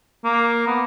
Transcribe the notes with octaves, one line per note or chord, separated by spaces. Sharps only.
A#3
B3